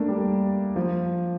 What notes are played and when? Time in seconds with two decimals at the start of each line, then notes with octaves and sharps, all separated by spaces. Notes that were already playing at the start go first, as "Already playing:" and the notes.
Already playing: A3 A#3 D4
0.08 G3
0.76 F3